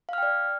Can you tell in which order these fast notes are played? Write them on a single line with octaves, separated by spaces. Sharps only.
F5 F6 G5 D5